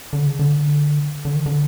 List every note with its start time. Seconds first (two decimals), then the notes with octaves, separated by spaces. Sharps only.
0.13 D3
0.26 C#3
0.39 D3
1.25 D3
1.36 D#3
1.46 D3